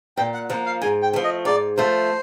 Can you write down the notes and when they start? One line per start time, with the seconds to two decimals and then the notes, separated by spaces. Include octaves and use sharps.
0.17 A#2 G5
0.34 F#5
0.50 F3 A#3 F#5
0.66 F5
0.82 G#2 G#5
1.02 G5
1.13 F3 A3
1.24 D#5
1.45 G#2 D5
1.77 F3 A3 C5